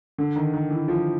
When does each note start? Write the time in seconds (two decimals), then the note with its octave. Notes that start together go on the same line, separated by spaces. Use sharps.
0.18 D3
0.36 D#3
0.54 D#3
0.71 E3
0.88 F3